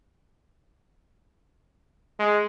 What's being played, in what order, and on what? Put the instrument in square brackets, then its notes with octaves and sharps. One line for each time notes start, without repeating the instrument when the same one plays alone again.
[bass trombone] G#3